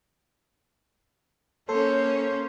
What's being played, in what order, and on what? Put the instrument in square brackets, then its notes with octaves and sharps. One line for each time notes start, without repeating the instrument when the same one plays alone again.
[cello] A#3 C#4 [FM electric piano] A4 [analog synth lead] C5 [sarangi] C#5